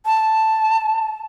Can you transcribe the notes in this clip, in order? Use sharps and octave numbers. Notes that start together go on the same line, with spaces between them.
A5